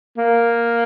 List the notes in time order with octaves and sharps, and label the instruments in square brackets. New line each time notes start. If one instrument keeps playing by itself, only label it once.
[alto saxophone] A#3